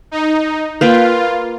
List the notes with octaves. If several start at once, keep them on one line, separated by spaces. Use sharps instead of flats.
D#4
A#3 F4 B4 G5